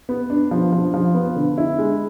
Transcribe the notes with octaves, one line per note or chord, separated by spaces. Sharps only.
B3
D4
F3
F3
F3
B3
D3
E4
G#3